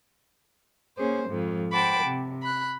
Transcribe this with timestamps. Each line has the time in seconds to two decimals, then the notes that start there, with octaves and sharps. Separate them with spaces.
0.97 A#3 C#4 G#4 C5
1.29 F2 G#2 F3
1.73 C5 F#5 G5 A5 B5 D6
2.04 C3
2.42 B5 F#6